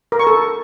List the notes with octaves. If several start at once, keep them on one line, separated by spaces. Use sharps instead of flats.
A#4
C#6
A4